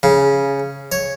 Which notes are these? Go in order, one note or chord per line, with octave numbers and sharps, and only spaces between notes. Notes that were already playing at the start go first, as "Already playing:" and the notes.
C#3
C#5